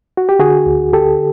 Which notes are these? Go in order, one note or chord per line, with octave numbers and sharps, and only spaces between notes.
F#4
G4
D3 F#4 G#4
D2
D3 G4 A4